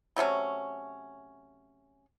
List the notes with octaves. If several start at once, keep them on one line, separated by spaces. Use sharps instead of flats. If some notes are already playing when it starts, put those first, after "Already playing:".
C3 F#3 A3 C#4